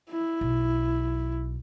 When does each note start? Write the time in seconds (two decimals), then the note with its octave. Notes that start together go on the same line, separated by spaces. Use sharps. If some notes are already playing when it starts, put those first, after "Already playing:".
0.10 E4
0.41 B1